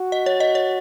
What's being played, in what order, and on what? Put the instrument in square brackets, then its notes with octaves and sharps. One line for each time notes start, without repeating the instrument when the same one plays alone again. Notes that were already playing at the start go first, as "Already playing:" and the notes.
Already playing: [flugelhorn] F#4
[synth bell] D#5
C#5
D#5
C#5